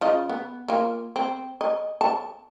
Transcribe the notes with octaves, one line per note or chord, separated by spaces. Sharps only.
C#3 F4 D#5
B3
A#3 F4
C4
D#5
A5